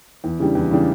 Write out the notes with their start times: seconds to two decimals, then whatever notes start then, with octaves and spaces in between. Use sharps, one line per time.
0.24 E2
0.39 C#3 E3 G3 D4
0.55 E2
0.71 C#3 E3 G3 D4